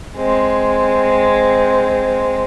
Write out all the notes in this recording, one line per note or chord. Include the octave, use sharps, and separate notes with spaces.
G#3 C4